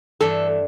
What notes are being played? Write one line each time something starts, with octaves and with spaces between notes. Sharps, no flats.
G2 E3 A3 D4 A4